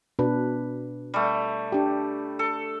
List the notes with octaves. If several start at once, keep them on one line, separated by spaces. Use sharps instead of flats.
B2 D4 B4
G3 A3
D4 G4
A4